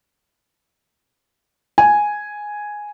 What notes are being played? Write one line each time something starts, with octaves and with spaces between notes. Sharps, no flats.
G#5